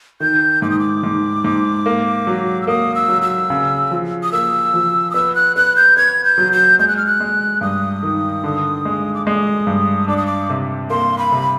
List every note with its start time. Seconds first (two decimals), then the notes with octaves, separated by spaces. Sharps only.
0.20 D#3 G6
0.62 G#2 D6
0.70 D#6
0.79 D6
1.03 G#2
1.44 G#2
1.86 A#3
2.27 F#3
2.62 E6
2.67 A#3 D#6
2.95 E6
3.08 F#3
3.22 E6
3.50 C#3
3.91 F3
4.23 D#6
4.32 A#3 E6
4.74 F3
5.11 D#6
5.14 B3 E6
5.35 F#6
5.56 B3 F#6
5.76 G6
5.97 B3 G#6
6.24 G6
6.38 F#3
6.52 G6
6.79 G#3 G6
6.88 F#6
6.97 F6
7.06 F#6
7.20 G#3
7.61 G2 D#6
8.03 D#3
8.44 D3
8.85 G#3
9.14 D6
9.26 G#3 D#6
9.67 G2
10.08 D4 D6
10.17 D#6
10.26 D6
10.50 C3
10.90 A#3 C6
11.18 B5
11.32 C3